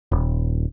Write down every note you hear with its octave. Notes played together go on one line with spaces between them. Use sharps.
D#1